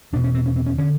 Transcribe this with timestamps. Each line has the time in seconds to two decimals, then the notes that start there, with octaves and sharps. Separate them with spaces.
0.13 E2 B2 D4
0.24 C#4
0.34 C4
0.46 C#4
0.56 C4
0.66 C#4
0.78 D3 C#4